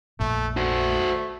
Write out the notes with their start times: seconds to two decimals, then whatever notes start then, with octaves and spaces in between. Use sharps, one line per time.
0.20 A#1 F2 A#2 A3
0.57 A3 F#4 C5